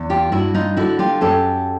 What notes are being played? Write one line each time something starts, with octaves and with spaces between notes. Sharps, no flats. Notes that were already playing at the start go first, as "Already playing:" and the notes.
Already playing: E2
F4 G4
G2 E4 F#4
D#4 F4
D3 E4 F#4
F4 G4
F#2 G4 A4